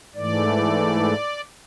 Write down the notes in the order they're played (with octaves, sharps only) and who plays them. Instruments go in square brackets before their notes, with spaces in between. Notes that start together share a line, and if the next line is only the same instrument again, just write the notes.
[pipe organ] G#2 E3 A3 D5